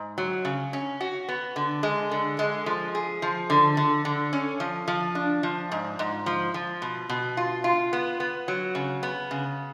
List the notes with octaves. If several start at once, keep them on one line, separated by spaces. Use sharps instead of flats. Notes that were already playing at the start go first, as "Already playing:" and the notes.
Already playing: G#2
F#3
C#3
C#4
F#4
B3
D3
G#3
D3
G#3
F3
G#4
F3
D3
D3
D3
C#4
F3
F3
D4
F3
G#2
G#2
F3
F3
B2
B2
F4
F4
B3
B3
F#3
C#3
B3
C#3